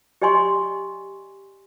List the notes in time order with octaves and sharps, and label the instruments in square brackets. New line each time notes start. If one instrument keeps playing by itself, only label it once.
[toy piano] G4 D5 D#5 G#5 C6 C#6